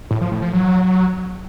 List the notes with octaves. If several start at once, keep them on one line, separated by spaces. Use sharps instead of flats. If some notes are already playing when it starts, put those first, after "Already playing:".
A2
F3
A2
F3
F#3